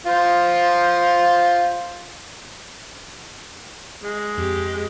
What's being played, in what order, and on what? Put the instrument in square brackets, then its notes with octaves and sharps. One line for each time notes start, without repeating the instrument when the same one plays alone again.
[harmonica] F4 C5
[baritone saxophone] G#3
[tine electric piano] F2 [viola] G4